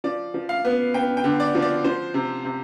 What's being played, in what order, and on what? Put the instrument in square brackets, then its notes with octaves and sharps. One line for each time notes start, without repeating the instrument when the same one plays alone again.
[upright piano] F3 D5
F3
F5
B3
B3 G5
G5
D3
D5
F3
D5
F3 C5
C3
C3